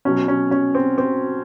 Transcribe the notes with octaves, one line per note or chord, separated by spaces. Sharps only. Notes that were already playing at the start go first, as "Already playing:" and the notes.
B2 F#3 C#4
C#4
C#4
C4
C4